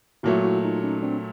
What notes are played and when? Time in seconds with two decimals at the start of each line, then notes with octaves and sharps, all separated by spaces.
0.23 A#2 F#3 A3 E4 F#4
0.44 E4 F#4
0.64 D#4 F4
0.83 C#4 D#4
1.02 C4 D4